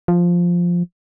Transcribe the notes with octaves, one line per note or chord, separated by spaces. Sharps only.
F3